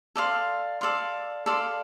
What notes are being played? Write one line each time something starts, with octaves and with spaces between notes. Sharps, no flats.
A4 D5 F5 C6
A4 D5 F5 C6
A4 D5 F5 C6